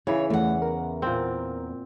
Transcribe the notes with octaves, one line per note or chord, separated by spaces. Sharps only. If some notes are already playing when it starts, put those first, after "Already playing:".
C#3 E3 C#5
E2 A3 F#5
A#4
A#2 C4